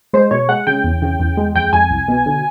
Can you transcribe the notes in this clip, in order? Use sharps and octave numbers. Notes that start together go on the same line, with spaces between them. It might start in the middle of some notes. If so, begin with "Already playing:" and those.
G#3 C5
B2 C#5
G#3 F#5
C#3 G5
E2
C#3
E2
G#3
F2 G5
F2 G#5
C2
B2
D3